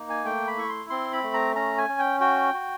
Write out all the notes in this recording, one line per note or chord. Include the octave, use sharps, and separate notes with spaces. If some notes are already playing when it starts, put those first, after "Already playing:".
Already playing: A#3 D#4
G#5
A3 G5
B5
E4 C#6
C6
C4 C6
B5
A3
A#5
C#4 A#5
G#5
C#4
G5
F#4 G5
F#4